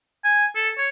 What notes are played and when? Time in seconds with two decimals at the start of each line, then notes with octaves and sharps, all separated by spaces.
0.24 G#5
0.55 A4
0.78 C#5